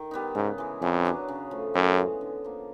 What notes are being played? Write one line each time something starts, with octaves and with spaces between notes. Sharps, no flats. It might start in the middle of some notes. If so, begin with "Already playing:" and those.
Already playing: D#3
G3 B3 D#4
G#2 C#3
E3 G#3
F2 C#3
F#3 B3 D4
C#3
F3 A3
F#2 A2
E3 G#3 B3
D3
F3 A#3